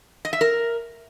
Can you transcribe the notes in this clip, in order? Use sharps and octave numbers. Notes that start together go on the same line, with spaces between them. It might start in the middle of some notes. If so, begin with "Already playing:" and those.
D#5
E5
A#4